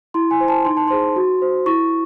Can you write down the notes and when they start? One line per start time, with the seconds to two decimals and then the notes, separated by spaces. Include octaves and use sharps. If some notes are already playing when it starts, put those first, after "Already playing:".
0.14 E4 C6
0.31 G#5
0.40 C5
0.48 A5
0.65 D#4 C6
0.77 A5
0.88 G#4 C5 C6
1.16 F#4
1.42 C5
1.66 E4 C#6